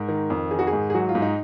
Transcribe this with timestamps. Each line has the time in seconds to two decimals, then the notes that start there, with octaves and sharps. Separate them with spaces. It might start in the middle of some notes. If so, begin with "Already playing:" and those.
Already playing: G#2 A#4
0.08 D#3
0.30 F2
0.51 D#3 G#4
0.59 F#4
0.67 G#4
0.73 G#2
0.90 G#4
0.94 F#3 F#4
1.09 F4
1.15 G#2
1.22 D#4